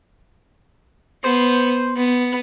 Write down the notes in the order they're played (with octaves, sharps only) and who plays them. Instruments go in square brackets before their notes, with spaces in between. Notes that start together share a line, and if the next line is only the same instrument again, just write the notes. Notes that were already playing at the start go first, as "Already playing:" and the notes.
[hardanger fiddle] B3 [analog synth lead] C5
[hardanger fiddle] B3